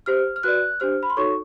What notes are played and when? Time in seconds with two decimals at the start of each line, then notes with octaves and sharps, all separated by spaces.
0.06 G4 C5 F6
0.36 F6
0.43 F#4 B4 D5 F#6
0.80 D4 G4 C5 F6
1.03 B5
1.10 C6
1.17 D#4 F#4 A4 C#5 C#6